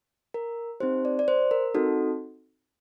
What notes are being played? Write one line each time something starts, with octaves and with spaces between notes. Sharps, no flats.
A#4
C4 D#4 G4 C5
D5
D5
C5
A#4
C4 D#4 F#4 A4